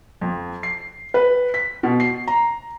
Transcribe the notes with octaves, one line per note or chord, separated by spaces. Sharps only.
F2
C7
B4
B6
B2
C7
A#5